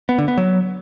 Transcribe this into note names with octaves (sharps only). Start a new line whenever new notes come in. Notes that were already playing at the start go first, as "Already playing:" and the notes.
B3
D3
B3
F#3